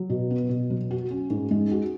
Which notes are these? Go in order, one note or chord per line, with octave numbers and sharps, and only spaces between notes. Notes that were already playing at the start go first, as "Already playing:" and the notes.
Already playing: F#3
B2
B3
B2
F#3
F#4
C#4
G#2
G#3
F#4